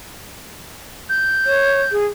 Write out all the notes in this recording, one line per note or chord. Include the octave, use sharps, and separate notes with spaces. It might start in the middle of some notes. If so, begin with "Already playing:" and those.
G6
C#5
G#4